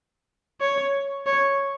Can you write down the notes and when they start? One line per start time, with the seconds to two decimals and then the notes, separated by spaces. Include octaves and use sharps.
0.61 C#5
1.27 C#5